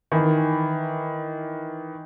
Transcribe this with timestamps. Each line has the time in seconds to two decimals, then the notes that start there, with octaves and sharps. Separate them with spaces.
0.12 D#3 E3